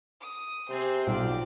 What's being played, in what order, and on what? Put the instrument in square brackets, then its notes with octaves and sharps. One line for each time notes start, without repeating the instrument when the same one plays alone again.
[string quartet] D#6
[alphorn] C3 [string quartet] C4 G#4 C5
[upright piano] B1 [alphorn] F4 [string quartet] G4 D5